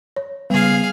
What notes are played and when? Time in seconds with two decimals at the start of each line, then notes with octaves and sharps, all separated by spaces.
0.16 C#5
0.50 C#3 G3 B3 G#4 F5